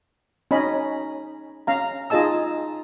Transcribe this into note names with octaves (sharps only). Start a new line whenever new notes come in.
C#4 D#4 D#5 B5
C#4 F5 A#5
D#4 F4 G#4 D#5 A5 E6